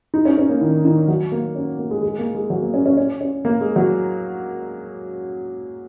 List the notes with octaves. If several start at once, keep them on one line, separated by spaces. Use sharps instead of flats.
D#4
C#4
C#4
A#3
D#3
D#3
F#3
A#3
C#4
A#3
G#3
G#3
A#3
G#3
F#3
A#3
C#4
C#4
C#4
C#4
A#3
G#3
F#3